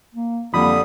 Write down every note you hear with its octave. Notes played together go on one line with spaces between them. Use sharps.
A#3
F2 D3 G3 A#3 B5 D#6